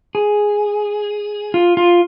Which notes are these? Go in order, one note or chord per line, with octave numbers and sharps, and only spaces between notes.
G#4
F4
F4